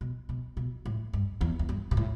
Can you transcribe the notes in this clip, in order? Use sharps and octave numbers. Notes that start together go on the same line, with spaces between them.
B2
B2
B2
A2
G2
E2
E2
G2
B2
A2